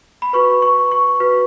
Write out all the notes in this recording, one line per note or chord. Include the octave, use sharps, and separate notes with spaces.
B5
F#4 B4 C#6
C#6
C#6
F#4 B4